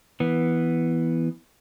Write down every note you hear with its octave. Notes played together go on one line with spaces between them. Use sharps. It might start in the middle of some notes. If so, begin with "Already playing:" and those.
E3 B3